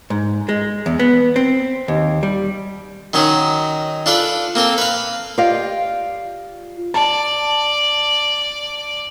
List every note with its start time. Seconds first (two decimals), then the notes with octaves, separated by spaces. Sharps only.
0.10 G#2
0.49 G#3
0.86 E2
0.99 B3
1.36 C4
1.88 D#2
2.23 G3
3.13 D#3 F#3 C#4 D#4
4.06 D4 F4 A4 B4
4.55 A#3 C4 A4
4.78 B4 F5
5.38 F4 G4 D5 D#5 F5
6.94 D5 A5